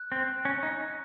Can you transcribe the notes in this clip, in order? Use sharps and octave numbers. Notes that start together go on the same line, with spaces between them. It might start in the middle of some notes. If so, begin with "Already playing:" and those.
Already playing: F#6
C4
C#4
D#4